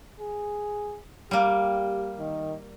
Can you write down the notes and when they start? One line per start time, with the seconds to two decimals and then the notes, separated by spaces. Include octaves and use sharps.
0.20 G#4
1.31 G3 A#3 G4
2.19 D#3